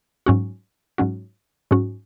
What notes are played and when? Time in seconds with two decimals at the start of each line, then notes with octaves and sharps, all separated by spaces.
0.26 G#2 F#3 C#4 F#4
0.98 G#2 F#3 C#4 F#4
1.71 G#2 F#3 C#4 F#4